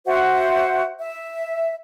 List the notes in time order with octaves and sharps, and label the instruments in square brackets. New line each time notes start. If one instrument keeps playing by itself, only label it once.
[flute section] F#4 C5 E5 F#5
E5